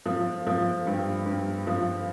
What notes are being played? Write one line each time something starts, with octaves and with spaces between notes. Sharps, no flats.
F3
F3
G2
G2
F3